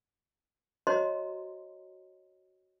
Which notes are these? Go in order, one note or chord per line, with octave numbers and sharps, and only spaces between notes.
F#4 C5 C#5 D#5 A#5 C6